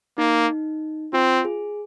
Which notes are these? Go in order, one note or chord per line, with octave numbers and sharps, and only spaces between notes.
A#3 D#4
C4 F4
G#4